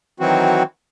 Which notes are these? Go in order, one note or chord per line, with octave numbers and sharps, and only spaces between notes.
D#3 E3 F#3 C4 F#4